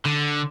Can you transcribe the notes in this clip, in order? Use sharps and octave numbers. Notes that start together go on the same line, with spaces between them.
D3